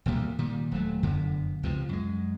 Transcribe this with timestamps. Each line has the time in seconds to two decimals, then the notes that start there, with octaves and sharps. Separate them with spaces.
0.06 E1 D2 A#2 G3
0.39 A#2 D#3 G3
0.71 D#1 F#3 A3
1.03 F1 F#2 D3 B3
1.63 C#2 C3 F3
1.89 F#2 G#3